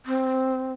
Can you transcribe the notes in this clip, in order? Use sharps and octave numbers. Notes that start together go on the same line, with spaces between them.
C4